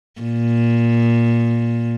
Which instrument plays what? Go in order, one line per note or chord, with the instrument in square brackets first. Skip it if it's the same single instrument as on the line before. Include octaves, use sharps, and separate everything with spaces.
[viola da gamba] A#2